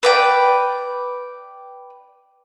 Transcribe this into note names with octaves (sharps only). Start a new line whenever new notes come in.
B4 D5 G5